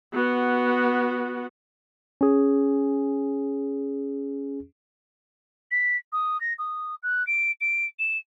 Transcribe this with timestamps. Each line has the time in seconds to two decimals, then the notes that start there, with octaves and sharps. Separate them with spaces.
0.13 B3 F#4
2.21 C#4 G#4
5.71 B6
6.13 D#6
6.41 A#6
6.59 D#6
7.03 F#6
7.27 D7
7.61 D7
7.99 E7